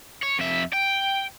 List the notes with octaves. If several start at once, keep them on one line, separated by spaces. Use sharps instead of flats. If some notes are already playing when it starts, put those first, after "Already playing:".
C#5
F2 E5
G5